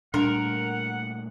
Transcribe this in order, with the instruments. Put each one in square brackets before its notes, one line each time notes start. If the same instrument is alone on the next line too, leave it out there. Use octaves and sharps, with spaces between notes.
[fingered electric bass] A#2 G3 A3 [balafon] D4 [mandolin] A#4 [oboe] F#5